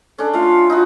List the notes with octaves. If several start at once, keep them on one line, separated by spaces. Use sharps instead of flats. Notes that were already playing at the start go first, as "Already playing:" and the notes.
C#4 D4 A4
A3 F4 F5
D#4 E4 F#4